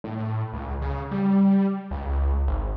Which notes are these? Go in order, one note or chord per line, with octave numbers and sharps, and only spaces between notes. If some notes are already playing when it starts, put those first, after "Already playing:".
A2
C#2
C#3
G3
C#2
G#1